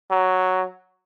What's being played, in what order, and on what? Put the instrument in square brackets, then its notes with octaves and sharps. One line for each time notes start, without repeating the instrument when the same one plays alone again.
[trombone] F#3